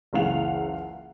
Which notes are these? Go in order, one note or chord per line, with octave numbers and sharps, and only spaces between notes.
F#1 C#2 E3 F5 F#5 F7